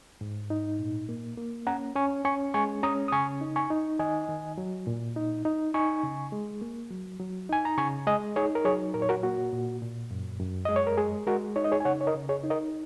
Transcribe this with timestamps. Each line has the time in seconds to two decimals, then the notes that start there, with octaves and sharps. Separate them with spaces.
0.21 G#2
0.50 D#4
0.79 A#2
1.09 A#3
1.38 A#3
1.67 C#4 F#5 A#5
1.96 C#4 G#5 C#6
2.25 C#4 G#5 C#6
2.54 G#3 G#5 C#6
2.83 C#4 A#5 D#6
3.08 D#6
3.12 C#3 G#5 C#6
3.41 D#4
3.56 G#5 C#6
3.70 D#4
3.99 D#3 D#5 G#5
4.29 D#3
4.58 F#3
4.87 A#2
5.16 D#4
5.45 D#4
5.74 D#4 G#5 C#6
6.03 C#3
6.32 G#3
6.62 A#3
6.91 F#3
7.20 F#3
7.49 D#4 G#5
7.65 A#5
7.78 C#3 G#5 C#6
8.07 G#3 D#5 G#5
8.36 D#4 G#4 C#5
8.55 A#4
8.65 F#3 G#4 C#5
8.94 A#2 A#4
9.02 C#5
9.09 F#4 A#4
9.23 A#3 F#4
9.53 A#2
9.82 A#2
10.11 F#2
10.39 F#2
10.65 G#3 D#5
10.76 C#5
10.87 A#4
10.98 G#3 G#4
11.27 G#3 F#4 A#4
11.56 D#4 C#5
11.64 D#5
11.72 G#4 C#5
11.80 G#5
11.85 C#3 C#5 F#5
12.01 C#5
12.07 A#4 D#5
12.15 C#3
12.29 G#4 C#5
12.44 D#4
12.50 A#4 D#5